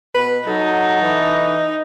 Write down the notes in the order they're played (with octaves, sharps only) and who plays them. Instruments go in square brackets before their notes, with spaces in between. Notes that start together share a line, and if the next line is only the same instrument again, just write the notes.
[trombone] B2 [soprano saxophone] B4
[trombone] F#3 [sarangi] D#4 [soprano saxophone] A4
[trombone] E3